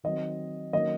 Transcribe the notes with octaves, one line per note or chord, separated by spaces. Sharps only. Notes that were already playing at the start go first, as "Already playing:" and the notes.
D#3 F#3 C4 D#5
D#3 F#3 A#3 C#4 D#5